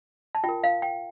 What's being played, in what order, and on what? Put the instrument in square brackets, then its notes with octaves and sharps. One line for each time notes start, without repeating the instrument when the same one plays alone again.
[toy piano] A5
F4 G5
A#4
F5
G5